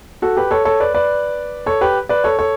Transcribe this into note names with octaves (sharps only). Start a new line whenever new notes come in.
F#4 A4
G4 B4
A4 C#5
A4 C#5
B4 D5
B4 D5
A4 C#5
G4 B4
B4 D5
A4 C#5
A4 C#5